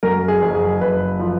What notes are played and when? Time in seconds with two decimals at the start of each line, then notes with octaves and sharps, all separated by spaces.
0.03 F#2 A#4
0.28 G#4
0.42 F#1
0.55 G#4
0.80 F#1 B4
1.19 F3